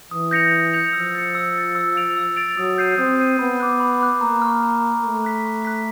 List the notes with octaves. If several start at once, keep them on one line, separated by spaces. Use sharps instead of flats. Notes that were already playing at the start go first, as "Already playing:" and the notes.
E3 D#6
G6 A#6 C#7 F7
D#6
G6 A#6 C#7 F7
F3 E6
A6 C#7
E6
A6 C#7
E6
A6 D7 F7
E6
A6 D7 F7
F#3 D#6
G6 C7 D#7
C4 D#6
G6 C7 D#7
B3 B5
D6 F#6
B5
D6 F#6
A#3 A#5
C#6 F6
A#5
C#6 F6
A3 C#6
F#6 B6
C#6
F#6 B6